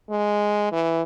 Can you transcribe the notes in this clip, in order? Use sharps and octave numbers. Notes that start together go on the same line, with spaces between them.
G#3
E3